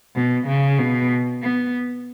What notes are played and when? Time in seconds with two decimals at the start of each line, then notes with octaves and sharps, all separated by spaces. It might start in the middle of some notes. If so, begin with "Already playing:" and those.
0.15 B2
0.47 C#3
0.79 B2
1.42 B3